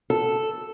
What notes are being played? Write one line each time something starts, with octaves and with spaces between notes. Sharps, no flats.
A4